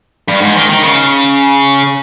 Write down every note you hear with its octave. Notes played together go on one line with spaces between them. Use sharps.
G2
G#2
D#3
D#3
C#3